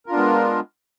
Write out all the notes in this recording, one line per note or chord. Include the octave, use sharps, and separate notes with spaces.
G#3 B3 D4 F4 A#4